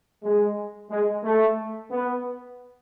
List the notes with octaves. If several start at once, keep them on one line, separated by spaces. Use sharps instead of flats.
G#3
G#3
A3
B3